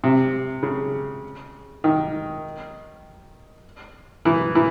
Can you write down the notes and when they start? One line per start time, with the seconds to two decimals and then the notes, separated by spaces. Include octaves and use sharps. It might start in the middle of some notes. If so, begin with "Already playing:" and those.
0.04 C3
0.63 C#3
1.84 D#3
4.25 E3
4.55 E3